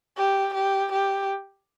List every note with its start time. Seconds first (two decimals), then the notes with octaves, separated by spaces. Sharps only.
0.17 G4
0.54 G4
0.92 G4